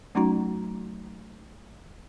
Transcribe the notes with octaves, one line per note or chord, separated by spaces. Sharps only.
F#3 A3 C#4 D#4 F#4 A#5